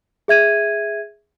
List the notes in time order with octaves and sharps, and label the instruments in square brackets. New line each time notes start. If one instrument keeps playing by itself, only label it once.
[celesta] G#4 E5 G#6 D#7